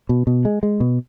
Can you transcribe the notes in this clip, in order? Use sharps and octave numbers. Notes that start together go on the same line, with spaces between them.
B2
B2
G#3
G#3
B2